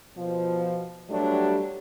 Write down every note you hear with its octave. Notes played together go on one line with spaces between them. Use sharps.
B2 F3
G2 F#3 G3 A3 D4